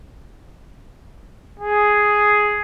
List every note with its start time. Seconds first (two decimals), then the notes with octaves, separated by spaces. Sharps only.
1.60 G#4